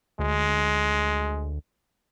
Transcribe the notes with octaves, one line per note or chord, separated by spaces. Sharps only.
D2 G#3